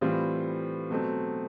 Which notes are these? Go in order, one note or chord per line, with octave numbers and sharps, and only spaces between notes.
A2 E3 G3 C4 F4
B2 F#3 A3 C4